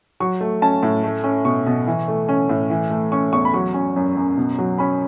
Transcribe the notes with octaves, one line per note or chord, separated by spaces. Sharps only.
F#3 C#6
A3
C#4 A5
A2
A3
C#4
B2 C#6
B2
E3
A3
C#4
A2
E3
A3
C#4 C#6
E2 C#6
B5
F#3 C#6
C#4
F#2
F#2
B2
F#3
C#4 B5